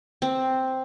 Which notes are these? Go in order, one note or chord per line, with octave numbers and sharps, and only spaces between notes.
C4